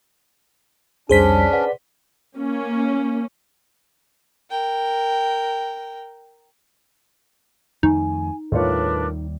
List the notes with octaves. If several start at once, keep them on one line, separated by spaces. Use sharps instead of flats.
C2 F2 G3 C#4 D4 G#4 C5 B6
B4 D5 F#5
A#3 C#4
A#4 G5
F2 D#3 A3 D#4 G#5
D#2 A2 G3 D4 F4 A#4 B4 C#5